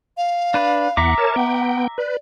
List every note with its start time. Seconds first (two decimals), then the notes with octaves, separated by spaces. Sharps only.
0.17 F5
0.54 D4 B4
0.97 E2 E5 F#5 A#5 D6
1.18 A#4 C#5 A5
1.36 B3 F#5 G5
1.98 B4 D5